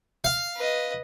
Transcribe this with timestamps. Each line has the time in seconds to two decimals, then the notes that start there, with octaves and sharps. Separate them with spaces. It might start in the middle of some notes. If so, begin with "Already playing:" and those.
0.24 F5
0.56 B4 D#5